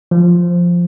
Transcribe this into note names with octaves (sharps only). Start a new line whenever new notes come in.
F3